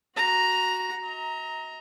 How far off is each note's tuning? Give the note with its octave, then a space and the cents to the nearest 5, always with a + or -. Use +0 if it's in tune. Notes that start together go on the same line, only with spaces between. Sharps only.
F#4 +0 A#5 +5
D#5 +45 A#5 +0